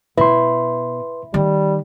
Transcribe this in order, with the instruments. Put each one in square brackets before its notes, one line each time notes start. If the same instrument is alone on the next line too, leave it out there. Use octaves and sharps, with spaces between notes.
[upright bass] B2 [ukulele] E4 [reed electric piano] B4 C6
[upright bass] D#3 [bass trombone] G3